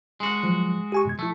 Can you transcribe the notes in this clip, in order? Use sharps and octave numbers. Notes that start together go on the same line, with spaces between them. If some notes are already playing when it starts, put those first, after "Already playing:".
G#3 F#4
F3 F#3
G4 G#5 C#6
F#2 B2 G#6
F3 A3 E4